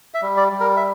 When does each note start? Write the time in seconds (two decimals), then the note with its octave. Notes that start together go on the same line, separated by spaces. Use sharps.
0.14 E5
0.22 G3
0.37 D5
0.52 G3
0.60 A#4
0.77 E5